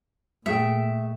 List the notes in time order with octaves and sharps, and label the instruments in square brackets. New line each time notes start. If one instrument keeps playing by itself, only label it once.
[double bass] A#2 [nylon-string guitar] A3 G#4 G5 [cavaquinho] E5